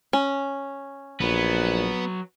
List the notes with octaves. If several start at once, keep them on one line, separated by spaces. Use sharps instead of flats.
C#4
A#1 F#3 B3 B4